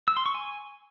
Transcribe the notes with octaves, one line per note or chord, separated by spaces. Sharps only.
E6
C6
C#6
G#5